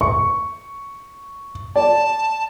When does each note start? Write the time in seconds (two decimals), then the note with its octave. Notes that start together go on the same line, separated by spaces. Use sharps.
0.01 C#6
1.76 D5 A5